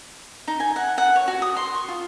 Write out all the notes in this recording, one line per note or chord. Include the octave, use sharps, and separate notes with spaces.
D#4
G#5
F#5
F#5
C#5
F#4
D#6
C6
C#6
F4